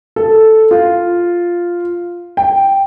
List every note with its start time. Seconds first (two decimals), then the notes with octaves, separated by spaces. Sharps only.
0.16 A4
0.71 F4
2.37 G5